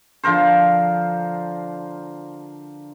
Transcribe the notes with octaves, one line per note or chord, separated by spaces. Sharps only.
D3 F3 A#4 C5